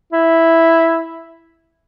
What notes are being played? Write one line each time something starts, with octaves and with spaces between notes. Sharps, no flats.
E4